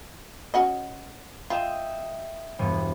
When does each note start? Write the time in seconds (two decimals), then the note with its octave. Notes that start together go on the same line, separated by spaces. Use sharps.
0.54 C#4 F#4 D#5
1.50 F4 D#5 E5 G5
2.59 E1 G2 B3